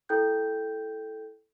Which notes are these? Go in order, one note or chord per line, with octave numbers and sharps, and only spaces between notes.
E4 A4 G5 F#6 G6